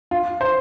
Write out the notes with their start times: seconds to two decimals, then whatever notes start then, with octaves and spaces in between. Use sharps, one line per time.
0.11 F4
0.41 C5